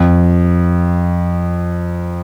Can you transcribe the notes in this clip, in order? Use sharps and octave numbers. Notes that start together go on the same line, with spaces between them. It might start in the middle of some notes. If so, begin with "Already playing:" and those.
Already playing: F2